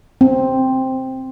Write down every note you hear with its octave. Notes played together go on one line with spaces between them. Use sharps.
C4